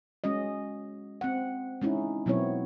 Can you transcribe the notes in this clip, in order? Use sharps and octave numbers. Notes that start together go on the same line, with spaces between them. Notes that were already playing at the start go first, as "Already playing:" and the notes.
G#3 C#4 F#4 D#5
C4 F#5
G#3 C#4 D#4 E4
B2 F#3 B3 C4 E4 C#5